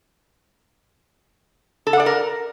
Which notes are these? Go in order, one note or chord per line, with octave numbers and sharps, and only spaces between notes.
A4
F#5
D5
A#4